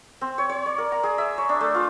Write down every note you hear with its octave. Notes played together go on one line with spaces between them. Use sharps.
C4
C#5
C#5
D5
A#4
A#5
G#4
E5
C#5
D4
A3
F4